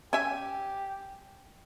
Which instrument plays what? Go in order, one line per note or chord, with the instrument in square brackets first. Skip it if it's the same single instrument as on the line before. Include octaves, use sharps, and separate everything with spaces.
[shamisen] C#4 E5 [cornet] G4 [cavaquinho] G#5